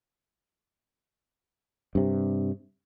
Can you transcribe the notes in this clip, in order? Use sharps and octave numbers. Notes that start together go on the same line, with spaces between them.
G2 C3